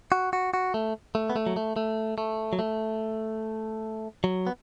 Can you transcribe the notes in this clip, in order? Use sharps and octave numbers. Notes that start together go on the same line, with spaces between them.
F#4
F#4
F#4
A3
A3
B3
A3
F#3
A3
A3
A3
F#3
A3
F#3
B3